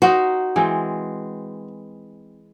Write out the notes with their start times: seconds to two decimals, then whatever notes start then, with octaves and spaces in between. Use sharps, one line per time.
0.02 D#4 F#4 A#4 C5
0.56 E3 G#3 C4